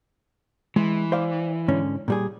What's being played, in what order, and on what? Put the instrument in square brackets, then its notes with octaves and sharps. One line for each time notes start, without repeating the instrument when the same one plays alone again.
[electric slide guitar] E3 [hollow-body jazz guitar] G#3
[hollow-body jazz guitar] C5 D5 F5
G#2 D3 C#4
A#2 G3 G#4